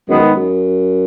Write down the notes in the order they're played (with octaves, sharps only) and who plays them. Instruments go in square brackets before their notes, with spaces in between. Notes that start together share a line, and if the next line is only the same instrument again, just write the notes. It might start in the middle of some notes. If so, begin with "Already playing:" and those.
[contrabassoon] F#2 [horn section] D#3 G#3 B3
[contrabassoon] G#2
F#2